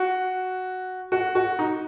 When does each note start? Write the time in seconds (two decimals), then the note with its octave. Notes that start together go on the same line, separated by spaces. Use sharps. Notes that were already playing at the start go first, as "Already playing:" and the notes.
Already playing: F#4
1.12 F#4
1.35 F#4
1.59 D#4